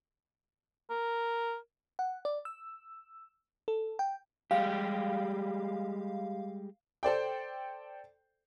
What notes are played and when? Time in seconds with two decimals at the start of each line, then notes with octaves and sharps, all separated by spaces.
0.90 A#4
1.99 F#5
2.25 D5
2.45 E6
3.68 A4
3.99 G5
4.51 G3 G#3 G4 F5
7.03 A4 C5 D5 G5